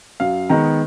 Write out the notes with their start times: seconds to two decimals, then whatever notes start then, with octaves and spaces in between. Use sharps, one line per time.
0.20 F#2 F5
0.49 D#3 G#3 B3 A#5